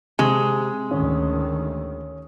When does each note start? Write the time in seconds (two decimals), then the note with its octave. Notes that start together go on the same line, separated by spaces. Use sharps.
0.19 C3 G#3 D#6
0.91 D2 D#3 C#4